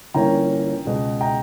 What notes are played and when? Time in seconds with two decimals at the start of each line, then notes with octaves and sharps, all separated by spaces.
0.14 G1 G2 E3 A#3 C#4 G5 A#5
0.85 C#2 B2 G#3 B3
1.21 G5 A#5